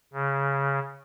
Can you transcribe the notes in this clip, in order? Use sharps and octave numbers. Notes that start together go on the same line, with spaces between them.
C#3